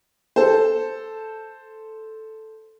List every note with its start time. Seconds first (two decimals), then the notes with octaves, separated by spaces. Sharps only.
0.36 A4 C5